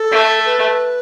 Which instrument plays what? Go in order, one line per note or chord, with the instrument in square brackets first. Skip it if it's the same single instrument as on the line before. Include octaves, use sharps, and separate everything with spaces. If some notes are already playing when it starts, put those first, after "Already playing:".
Already playing: [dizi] A4
[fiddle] A3
[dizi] B4